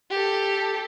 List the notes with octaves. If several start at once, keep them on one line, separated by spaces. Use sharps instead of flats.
G4 A4